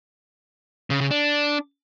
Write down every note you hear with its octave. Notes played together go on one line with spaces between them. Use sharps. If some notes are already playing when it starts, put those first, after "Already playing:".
C#3
C#3
D4